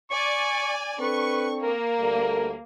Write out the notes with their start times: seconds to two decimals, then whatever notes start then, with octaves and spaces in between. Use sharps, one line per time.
0.11 D5 G#5 C#6
1.00 C4 D4 A4 B4 C#6
1.62 A#3 A#4
2.00 D2 G3 A4